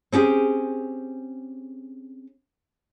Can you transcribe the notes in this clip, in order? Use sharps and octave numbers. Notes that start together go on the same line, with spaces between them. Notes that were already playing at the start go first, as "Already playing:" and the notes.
C4 C#4 G4 G#4